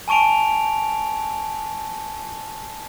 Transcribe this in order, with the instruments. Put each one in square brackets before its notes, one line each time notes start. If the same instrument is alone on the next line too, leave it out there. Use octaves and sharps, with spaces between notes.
[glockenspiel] G#5 A5 C#6 D7 F7